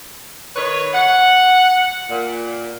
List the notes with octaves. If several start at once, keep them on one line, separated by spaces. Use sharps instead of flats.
D#3 B4 C#5
F#5
A#2